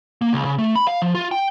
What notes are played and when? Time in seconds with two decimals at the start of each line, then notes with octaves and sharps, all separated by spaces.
0.22 A#3
0.33 C#2
0.45 C#3
0.58 A3
0.76 B5
0.87 F5
1.02 F3
1.15 F4
1.31 G5